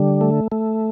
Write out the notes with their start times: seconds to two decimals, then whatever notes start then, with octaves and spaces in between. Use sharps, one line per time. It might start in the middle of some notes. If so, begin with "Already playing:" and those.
Already playing: D3 G3
0.21 A3
0.52 A3